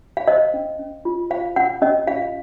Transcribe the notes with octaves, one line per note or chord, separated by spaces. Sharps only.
F5
C5 D#5
C#4
C#4
F4
C5 F5
C#4 F#5
C#4 D#5
F4 F5